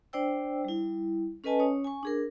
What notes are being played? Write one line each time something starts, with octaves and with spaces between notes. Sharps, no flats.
D4 C5 D5 G5 E6
G3 E4
C#4 A4 B4 D#5 G#5 A5
C#4 C#5 D#6
G#5 C#6
D4 G#4 A#4